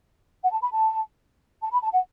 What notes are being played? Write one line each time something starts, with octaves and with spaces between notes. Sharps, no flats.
F#5
A5
B5
A5
A5
B5
A5
F#5